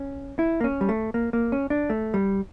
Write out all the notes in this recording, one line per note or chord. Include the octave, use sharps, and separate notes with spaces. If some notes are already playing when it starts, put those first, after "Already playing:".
Already playing: C#4
E4
A#3
C#4
G3
A3
A#3
A#3
C#4
D4
A3
G3